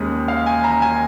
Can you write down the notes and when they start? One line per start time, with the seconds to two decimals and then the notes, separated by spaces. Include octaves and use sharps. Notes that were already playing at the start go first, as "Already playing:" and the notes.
Already playing: D#2 C#3 G#3 D#6
0.28 F5
0.46 G#5
0.64 A#5
0.82 G#5